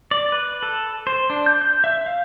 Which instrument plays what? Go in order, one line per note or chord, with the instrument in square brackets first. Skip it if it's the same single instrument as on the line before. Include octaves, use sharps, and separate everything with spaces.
[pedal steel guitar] D5
B4
A4
C5
D4
G6
G6
E5
F5